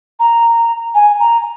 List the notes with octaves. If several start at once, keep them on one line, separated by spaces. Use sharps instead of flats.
A#5
G#5
A#5